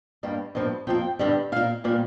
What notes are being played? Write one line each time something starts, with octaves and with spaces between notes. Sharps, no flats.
G2 G3 A#3
G2 F3 A#3
F2 F3 A#3 G5
G2 D3 G3
A#2 A#3 F5
A#2 G3 A#3 D5